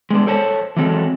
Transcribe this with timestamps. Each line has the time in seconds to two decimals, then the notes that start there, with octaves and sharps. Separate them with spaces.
0.11 G#3 B3 D4
0.27 A4 C5 C#5 A5
0.77 E3 F#3 G#3 C4 A4